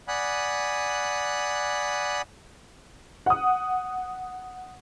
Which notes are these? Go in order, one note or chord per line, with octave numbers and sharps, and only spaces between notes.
D5 F#5 G#5 B5 D#6 F#6
F#5 D#6